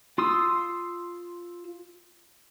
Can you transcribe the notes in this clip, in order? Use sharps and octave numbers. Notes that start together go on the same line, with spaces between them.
F4 C6 D#6 E6